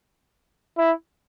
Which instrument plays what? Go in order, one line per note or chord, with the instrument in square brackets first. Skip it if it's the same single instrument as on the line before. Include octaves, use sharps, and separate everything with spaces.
[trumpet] E4